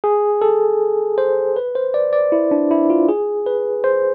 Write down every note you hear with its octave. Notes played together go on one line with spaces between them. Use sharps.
G#4
A4
C5
B4
C5
D5
D5
E4
D4
E4
F4
G#4
B4
C5